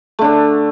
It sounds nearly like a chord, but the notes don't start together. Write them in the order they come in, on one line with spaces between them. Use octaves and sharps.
A3 D3 D4